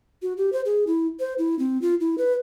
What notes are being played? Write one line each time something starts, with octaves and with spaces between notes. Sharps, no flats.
F#4
G4
C5
G#4
E4
C5
E4
C4
F4
E4
B4